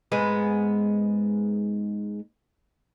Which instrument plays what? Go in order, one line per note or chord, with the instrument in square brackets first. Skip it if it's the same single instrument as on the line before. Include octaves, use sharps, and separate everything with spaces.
[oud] G#2 G#3 B3